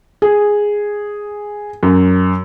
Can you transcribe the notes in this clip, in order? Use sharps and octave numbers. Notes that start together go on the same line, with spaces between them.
G#4
F#2